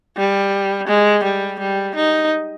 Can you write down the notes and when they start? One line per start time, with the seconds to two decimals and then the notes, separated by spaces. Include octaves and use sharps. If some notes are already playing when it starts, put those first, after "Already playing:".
0.17 G3
0.88 G#3
1.24 G3
1.59 G3
1.96 D#4